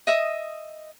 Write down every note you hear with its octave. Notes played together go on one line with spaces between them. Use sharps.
D#5 E5 D#6